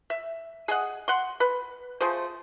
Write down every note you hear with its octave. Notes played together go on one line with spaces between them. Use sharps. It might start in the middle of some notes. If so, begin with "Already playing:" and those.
E5
G#4 D#5 F#5
F#5 C6
B4
F3 A3 G#4 C5